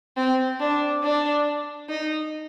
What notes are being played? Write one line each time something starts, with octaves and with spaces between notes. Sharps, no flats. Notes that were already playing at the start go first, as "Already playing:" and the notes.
C4
D4
D4
D#4